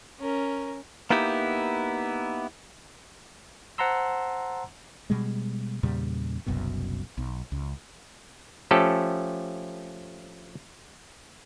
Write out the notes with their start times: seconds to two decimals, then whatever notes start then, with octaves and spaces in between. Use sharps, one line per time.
0.20 C#4 A#4
1.10 A#3 B3 D#4 E4 G4
3.78 C5 F#5 A5 A#5 C6 E6
5.10 B2 G3 G#3
5.83 E2 A#2 C#3 G3
6.47 F#1 C2 F#2 B2
7.18 B1
7.52 C#2
8.71 F3 A3 C#4 G4 A4